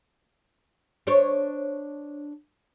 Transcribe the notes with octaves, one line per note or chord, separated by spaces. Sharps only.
D4 C5 C#5